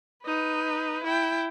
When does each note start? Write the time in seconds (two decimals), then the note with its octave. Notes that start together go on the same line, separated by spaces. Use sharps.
0.25 D#4 B4
1.04 E4 G5